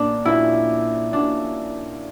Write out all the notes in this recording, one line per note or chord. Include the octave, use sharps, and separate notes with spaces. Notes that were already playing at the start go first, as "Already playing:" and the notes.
Already playing: A#1 A#2 A#3 C#4 D4
A#1 A#2 A#3 C#4 E4 F#4
A#1 A#2 A#3 C#4 D4 F#4